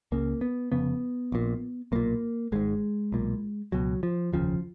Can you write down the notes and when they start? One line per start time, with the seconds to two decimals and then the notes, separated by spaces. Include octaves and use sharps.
0.12 C#2 C#3 A#3
0.41 B3
0.72 F1 F2 C#3 B3
1.32 A#1 A#2
1.92 B1 A#2 A#3
2.52 G#1 G#2 G#3
3.12 B1 A#2
3.72 C#2 B2 F#3
4.03 F3
4.32 F1 D#2 C#3 F3